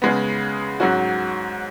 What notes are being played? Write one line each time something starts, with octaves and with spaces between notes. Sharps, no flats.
C#3 G#3 B3
G#2 F#3 C#4 F#4